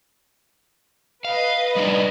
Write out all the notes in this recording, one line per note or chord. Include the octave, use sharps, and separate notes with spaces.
B4 D#5 F5
G3 D4 D#4